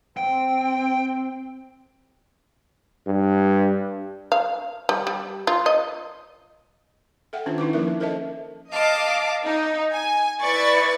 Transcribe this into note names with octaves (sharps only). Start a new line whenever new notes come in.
C4 G5
G2
F5
G3
G3
F4
D#5
A4 E5 F#5 G5
D#3 C#4 D4 F4 C5
D#4 E4 B4 D6
F3 A#3 A#4 E5
C#4
A4 A#4 C5 D#5 E5 A5
D#5 F5 A5 D6
D#4
G#5
E4 B4 D5 C#6 A6